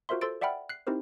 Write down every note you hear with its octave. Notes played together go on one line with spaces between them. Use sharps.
F4 F#4 A#4 C5 E5 C6
A4 C5 C6 E6 A6 D7
D5 E5 F#5 G5 B5 F6
F#6 C7
C4 D#4 E4 G4 A#4 C5